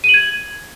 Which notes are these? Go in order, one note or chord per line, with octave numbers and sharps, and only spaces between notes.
D#7
F#7
G#6